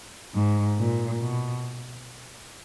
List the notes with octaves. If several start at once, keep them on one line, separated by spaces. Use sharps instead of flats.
G#2
A#2
B2